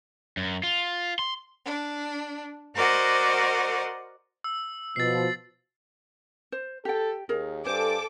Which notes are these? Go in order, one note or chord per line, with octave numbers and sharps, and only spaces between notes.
F#2
F4
C6
D4
F#4 A#4 C5 D5 D#5 F#5
E6
B2 F3 A6 C7
C5
G4 A4 G5
D#2 G#4 A#4
G2 A4 C5 G#5 D6